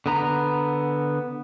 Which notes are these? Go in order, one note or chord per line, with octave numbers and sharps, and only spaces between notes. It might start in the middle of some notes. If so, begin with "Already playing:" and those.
D3 B3 A#5 B5